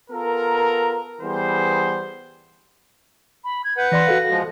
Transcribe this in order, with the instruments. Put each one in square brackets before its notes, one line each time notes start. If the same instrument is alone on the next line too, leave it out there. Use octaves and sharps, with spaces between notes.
[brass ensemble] B3 F4 A4 A#4
E3 G3 B3 G#4 C5
[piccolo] B5
G#6
[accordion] B4 F#5 [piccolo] G6
[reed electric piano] E3 D5 C6 [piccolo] A#6
[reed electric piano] F#4 A4 F5
[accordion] F3 G#3